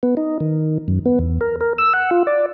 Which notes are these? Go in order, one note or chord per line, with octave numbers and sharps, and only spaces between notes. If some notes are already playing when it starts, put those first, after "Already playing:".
B3
D#4
D#3
F#2
B3
E2
A#4
A#4
E6
F#5
F4
D5